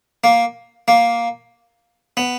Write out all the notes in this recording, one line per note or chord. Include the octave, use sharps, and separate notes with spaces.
A#3
A#3
B3